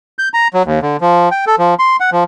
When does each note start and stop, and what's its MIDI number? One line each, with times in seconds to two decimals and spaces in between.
0.19 0.29 91
0.34 0.48 82
0.54 0.63 54
0.65 0.80 39
0.82 0.97 50
1.01 1.29 53
1.31 1.45 79
1.47 1.56 69
1.59 1.74 53
1.79 1.97 84
2.00 2.10 78
2.12 2.24 53